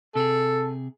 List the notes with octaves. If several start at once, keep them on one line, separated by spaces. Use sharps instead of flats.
C3 G#4 A4